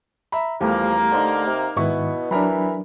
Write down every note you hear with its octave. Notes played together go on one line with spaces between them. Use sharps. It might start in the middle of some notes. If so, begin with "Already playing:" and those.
E5 A#5 B5
E2 F3 G3 A3 A#3 G4
D3 D#4 C5
C3
G#2 B2 D#3 B3 E4 C#6
E3 F#3 D4 A#4 A#5 B5